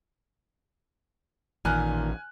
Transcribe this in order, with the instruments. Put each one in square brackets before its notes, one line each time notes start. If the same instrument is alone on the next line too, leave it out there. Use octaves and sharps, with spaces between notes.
[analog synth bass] A1 [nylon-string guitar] A#2 D#3 [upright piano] G#5 F6 F#6